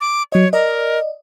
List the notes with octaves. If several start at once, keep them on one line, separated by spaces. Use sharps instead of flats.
D6
F#3 C#5 D#5
A#4 D5 D#5